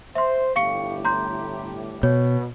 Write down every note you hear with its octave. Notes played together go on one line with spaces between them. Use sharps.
C5 E5 C6
G1 A2 G4 F5 C#6 C#7
A#5 C6 G6
B2 C#5